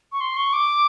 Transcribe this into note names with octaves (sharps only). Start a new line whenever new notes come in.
C#6
C6
C#6
D6